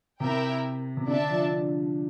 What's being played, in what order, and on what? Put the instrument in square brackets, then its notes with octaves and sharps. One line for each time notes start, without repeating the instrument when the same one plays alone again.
[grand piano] C3 [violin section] E4 A#4 E5 G5
[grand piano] C3
[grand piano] D3 [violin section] D4 A4 E5 A5
[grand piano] F3